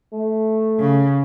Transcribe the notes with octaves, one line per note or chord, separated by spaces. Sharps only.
A3
C#3